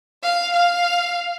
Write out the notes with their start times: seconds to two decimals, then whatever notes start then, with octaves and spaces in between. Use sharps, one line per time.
0.23 F5
0.53 F5